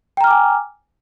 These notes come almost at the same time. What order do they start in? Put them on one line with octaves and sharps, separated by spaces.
G5 A#5 F6 D6 G#5